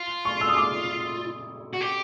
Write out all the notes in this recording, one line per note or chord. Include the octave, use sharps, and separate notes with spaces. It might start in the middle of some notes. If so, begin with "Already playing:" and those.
Already playing: F4
C#6
E6
D#6
D6
F#4
G4